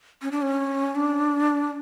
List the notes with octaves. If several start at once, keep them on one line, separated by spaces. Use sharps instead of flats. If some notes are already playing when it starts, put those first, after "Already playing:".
C#4
D4
C#4
D4